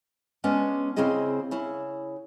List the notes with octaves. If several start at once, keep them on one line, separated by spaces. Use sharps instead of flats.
G#3 B3 C#4 D4
C#3 C4 E4 G#4 D#5
C#3 E4